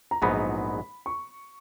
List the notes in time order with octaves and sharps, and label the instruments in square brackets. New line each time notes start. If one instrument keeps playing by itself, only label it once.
[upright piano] A#5
[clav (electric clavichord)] A#1 G#2 F#3 B3 D#4 [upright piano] B5
[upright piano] C#6